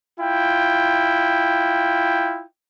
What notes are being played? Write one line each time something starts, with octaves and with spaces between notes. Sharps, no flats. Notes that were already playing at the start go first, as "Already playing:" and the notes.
E4 F4 G5